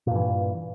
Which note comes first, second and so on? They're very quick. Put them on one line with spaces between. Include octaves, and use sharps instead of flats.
A#2 G2 E3